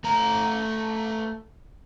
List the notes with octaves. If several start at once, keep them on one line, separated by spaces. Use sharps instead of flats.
A3 A#5